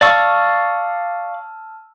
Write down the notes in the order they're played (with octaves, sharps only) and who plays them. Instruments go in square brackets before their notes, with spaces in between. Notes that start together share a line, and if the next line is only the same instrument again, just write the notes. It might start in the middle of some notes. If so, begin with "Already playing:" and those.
[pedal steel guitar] D5 F5 C#6 [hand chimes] A5 E6 F6